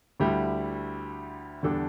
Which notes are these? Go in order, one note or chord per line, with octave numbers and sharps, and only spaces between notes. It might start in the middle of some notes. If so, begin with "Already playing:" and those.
D2 D3 G3 E4
E2 D3 G3 D4 A4